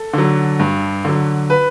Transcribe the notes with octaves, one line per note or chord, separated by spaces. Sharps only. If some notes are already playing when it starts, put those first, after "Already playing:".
Already playing: A4
D3 F#3
G2
D3 F#3
B4